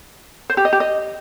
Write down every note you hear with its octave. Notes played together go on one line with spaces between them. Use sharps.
C5
G4
D#5
G4
D#5